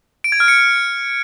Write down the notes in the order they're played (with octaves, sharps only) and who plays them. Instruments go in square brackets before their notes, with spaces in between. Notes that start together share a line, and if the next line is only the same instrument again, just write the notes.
[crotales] D7
G#6
F6
C#7